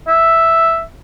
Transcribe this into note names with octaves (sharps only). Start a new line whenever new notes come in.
E5